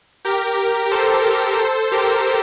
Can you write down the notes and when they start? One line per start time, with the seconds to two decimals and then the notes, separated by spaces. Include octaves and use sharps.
0.25 G4 A#4
0.91 A4 C5
1.25 G4 A#4
1.58 A4 C5
1.92 G4 A#4